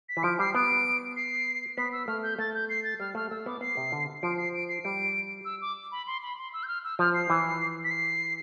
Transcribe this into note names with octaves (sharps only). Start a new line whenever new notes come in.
B6
E3
F3 D7
G3 C7
B3 D7
C7
B3 B6
E6
A3 F6
G6
A3 A6
G6
C7
A6
G3 F6
A3 F6
A3 E6
B3 D6
B3 C7
C3
D3
F3 D7
C7
D7
C7
G3 D7
E6
D6
B5
C6
B5
C6
E6
G6
F6
E6
F3 F6
C7
E3
B6
C7